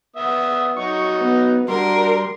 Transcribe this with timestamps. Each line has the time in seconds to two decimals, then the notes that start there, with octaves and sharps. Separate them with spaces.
0.16 B3 E5 D#6
0.77 F#3 D#4 F#4 C#6
1.21 B3
1.68 G3 D4 F#4 A#4 C6